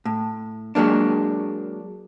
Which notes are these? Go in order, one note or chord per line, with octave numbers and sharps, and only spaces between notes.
A2
F#3 G#3 A#3 D4